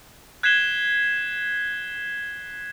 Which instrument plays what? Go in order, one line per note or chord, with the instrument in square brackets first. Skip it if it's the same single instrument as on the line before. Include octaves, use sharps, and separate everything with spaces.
[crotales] F#6 G#6 B6 C7 E7 G7